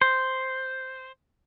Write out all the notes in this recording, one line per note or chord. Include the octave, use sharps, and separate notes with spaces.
C5